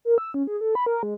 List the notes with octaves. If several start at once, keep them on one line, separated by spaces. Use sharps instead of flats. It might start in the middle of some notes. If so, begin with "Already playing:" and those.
A#4
E6
C#4
G#4
A4
B5
A#4
G#3